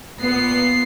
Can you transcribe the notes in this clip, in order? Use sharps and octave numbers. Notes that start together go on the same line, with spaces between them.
A#2 B3 C7